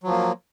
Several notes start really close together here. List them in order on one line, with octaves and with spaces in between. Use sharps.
F#3 F3 A#3